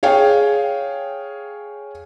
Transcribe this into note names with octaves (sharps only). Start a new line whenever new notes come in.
G#4 C#5 F5 G5